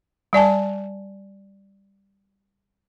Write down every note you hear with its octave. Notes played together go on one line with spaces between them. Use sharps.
G3 D5 G#5 A5